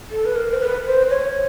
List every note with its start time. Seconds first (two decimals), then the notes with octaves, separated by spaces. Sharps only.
0.11 A4
0.26 B4
0.36 A#4
0.51 C5
0.60 B4
0.86 C5
1.10 C#5